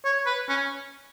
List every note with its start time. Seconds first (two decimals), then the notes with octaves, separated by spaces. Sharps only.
0.05 C#5
0.26 B4
0.48 C#4